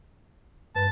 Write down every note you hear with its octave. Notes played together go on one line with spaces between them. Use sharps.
G2 B4 A5